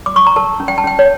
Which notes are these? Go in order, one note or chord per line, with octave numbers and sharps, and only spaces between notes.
D6
C#6
A#5
A#4 A5
C#4
G5
A5
C#4 G5
C#5